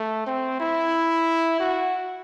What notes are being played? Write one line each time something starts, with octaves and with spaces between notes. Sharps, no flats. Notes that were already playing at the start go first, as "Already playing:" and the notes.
Already playing: A3
C4
E4
F#4